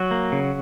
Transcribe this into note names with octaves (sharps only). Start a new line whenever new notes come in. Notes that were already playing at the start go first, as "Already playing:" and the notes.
Already playing: F#3 F#4
A#3
C#3